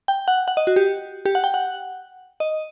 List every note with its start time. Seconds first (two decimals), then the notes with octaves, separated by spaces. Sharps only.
0.08 G5
0.28 F#5
0.48 F#5
0.57 D#5
0.67 F#4
0.76 G4
1.25 G4
1.35 F#5
1.44 G5
1.54 F#5
2.40 D#5